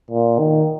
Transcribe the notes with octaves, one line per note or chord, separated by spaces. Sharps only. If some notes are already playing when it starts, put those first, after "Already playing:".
A#2
D#3